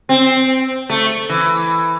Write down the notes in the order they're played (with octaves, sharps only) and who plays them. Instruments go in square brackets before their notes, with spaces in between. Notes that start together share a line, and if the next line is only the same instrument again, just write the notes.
[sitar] C4
A3
E3